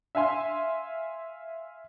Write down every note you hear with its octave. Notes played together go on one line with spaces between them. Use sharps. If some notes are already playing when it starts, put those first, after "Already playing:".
E5 F5 G#5 C6